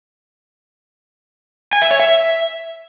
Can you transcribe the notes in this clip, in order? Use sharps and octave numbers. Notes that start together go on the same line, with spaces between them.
G#5
E5
C#5
E5